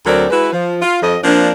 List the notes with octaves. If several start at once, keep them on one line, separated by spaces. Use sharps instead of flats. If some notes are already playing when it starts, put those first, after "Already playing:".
D2 F#3 C4 A4 A#4 D5
G#3 E4 F#4 B4
F3
F4
F2 D#5
F3 A#3 C4 D4